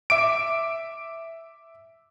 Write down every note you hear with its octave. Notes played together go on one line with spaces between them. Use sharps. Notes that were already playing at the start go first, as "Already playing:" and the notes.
E5 D6 D7